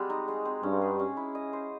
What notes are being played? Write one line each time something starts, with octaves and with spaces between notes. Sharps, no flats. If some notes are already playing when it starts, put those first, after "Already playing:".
Already playing: G3 G#3 C4 F#4
D#4
G#3
C4
G2 C#4
G#4
C#4
E4
D#5
C5